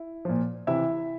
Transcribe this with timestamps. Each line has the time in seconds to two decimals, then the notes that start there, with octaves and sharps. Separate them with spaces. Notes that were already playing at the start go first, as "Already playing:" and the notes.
Already playing: E4
0.25 A#2 F3
0.67 C3 E3 E4 E5